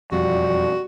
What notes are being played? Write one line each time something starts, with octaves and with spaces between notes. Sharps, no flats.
E1 F2 G3 F#4